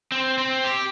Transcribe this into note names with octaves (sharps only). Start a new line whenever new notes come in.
C4
C4
G4